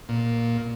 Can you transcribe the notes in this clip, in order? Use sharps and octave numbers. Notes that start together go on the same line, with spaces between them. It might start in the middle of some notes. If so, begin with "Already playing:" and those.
A#2